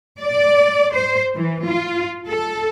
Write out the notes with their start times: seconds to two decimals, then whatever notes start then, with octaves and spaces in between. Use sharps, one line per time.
0.21 D5
0.94 C5
1.36 E3
1.67 F4
2.28 A4